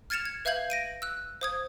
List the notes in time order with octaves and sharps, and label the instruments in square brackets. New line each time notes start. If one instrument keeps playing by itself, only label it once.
[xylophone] F6 G#6 A6 C#7 E7 F7
G#6
B4 E5 F5 G6 G#6 F#7
A#6 D7 D#7
E6 F#6
C5 D#6 G#6